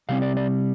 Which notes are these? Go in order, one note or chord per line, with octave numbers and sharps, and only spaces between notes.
C3 G3 C4 F5
D5
D5